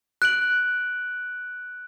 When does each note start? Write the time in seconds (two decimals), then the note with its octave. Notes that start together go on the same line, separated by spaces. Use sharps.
0.22 F#6 D7 F#7